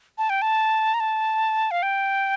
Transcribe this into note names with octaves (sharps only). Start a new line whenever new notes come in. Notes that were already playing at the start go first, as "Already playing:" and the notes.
A5
G5
A5
A#5
A5
F5
G5